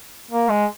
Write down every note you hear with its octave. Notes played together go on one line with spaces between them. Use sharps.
A#3
G#3